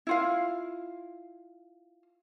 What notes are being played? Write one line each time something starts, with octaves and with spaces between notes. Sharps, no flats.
E4 F4 F5